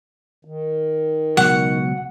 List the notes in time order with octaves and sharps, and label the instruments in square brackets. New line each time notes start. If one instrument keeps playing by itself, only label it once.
[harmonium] D#3
[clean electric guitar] C#2 B2 F#3 [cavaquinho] F#5